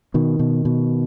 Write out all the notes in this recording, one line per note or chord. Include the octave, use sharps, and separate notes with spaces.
B2 D#3
B2
B2